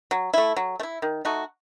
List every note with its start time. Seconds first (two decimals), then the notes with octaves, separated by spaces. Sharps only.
0.11 F#3
0.34 A3 E4
0.57 F#3
0.80 A3
0.83 E4
1.02 D#3
1.25 A3 D#4 F#4